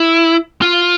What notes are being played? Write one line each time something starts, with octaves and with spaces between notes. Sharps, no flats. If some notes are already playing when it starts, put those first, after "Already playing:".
Already playing: E4
F4